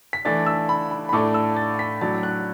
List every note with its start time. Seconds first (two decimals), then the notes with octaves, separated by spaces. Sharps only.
0.13 B6
0.25 E3 A3 D4 A6
0.46 E6
0.69 B5
0.91 B5
1.09 B5
1.13 A2 A3 D4 D6
1.34 E6
1.56 A6
1.79 B6
2.01 A2 F#3 D4 A6
2.23 F#6